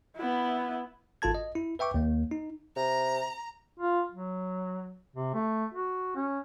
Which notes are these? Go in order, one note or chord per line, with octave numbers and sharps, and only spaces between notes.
B3 E4
G#1 F4 A4 A5 G#6
D#5
E4
B4 E5 G5 C#6 D6
D#2 A#3
D#4
C3 A#5
F4
F#3
C3
A3
F#4
C#4